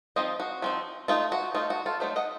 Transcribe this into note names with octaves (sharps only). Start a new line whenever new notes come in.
F3 C4 D#4 C5 D#5
F#4
F3 C4 D#4
A3 D#4 F4
F#4
A3 D#4 F4
F#4
F4 A4
F#3 A3 D#4 C5
D#5 F#5